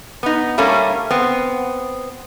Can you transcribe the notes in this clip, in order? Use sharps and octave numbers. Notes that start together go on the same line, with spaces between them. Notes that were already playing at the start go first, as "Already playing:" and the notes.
B3 D#4
G3 A3 A#3 C#4
B3 C4